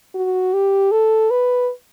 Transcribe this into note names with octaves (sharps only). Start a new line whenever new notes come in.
F#4
G4
A4
B4